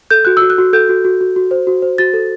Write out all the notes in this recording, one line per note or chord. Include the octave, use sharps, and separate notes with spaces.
A4 G6
F#4 F#6
F#4 E6
F#6
F#4
A4 G6
F#4
F#4
F#4
F#4
C5
F#4
C5
F#4 A6
A4